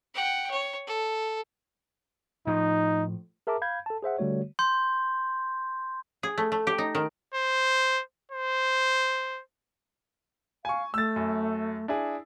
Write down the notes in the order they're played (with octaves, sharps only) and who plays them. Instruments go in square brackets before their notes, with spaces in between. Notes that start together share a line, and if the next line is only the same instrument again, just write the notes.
[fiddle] F#5 G5
C#5
A4
[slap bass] A2 F3 [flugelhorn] D#4
[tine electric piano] G#4 A#4 E5 A5 A#5 D6
F5 B5 G6 G#6
A4 A5
G#4 C5 E5 F#5
D3 G3 A3 F#4 C#5
[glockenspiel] C6 G6
[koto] G#4
A3
A3
G4
D#4
D#3
[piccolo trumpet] C5
C5
[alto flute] F5 [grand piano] G#5 C#6
[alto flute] A3 [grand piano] E6 A6
[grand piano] F#2
D4 E4 G#4